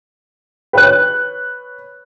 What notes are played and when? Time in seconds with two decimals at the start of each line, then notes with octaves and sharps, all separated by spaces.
0.73 B4 C#5 F#6